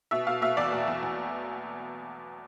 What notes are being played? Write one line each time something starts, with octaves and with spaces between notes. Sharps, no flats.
B2 E5
B2 F5
B2 E5
E2 D5
B2
E2
E2